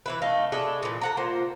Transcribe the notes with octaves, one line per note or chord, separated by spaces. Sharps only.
E3 E4 B4
A3 D#4 F5
D4 E4 G#4 A4
A#2 E3
A4 F#5 A#5
A#3 F4 C5